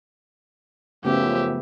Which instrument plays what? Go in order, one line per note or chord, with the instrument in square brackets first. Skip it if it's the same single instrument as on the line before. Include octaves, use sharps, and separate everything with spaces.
[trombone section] F#2 F3 [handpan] C#3 A3 B3 [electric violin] G4 E5